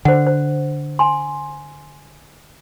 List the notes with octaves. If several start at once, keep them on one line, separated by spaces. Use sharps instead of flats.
D3 C5 F#5
C5
G#5 C6